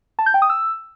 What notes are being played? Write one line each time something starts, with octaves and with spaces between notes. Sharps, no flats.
A5
G6
G5
D#6
E6